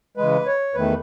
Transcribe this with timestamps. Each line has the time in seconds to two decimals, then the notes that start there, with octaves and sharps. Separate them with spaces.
0.17 C#3 E3 G#3 B4
0.46 C#5
0.74 E2 D#3 A3 B4